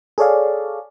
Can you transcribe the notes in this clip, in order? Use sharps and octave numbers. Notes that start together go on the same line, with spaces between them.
G#4 A4 C#5 D5 F5